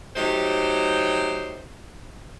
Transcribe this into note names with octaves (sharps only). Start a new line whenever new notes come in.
F#3 A3 D#4 G4 C5